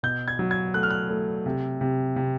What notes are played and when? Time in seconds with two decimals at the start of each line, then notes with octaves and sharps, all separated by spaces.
0.03 B2 G6
0.28 G#6
0.39 F#3
0.51 G#6
0.74 A3 F#6
0.83 F6
0.90 F#6
1.10 A3
1.46 C3
1.81 C3
2.16 C3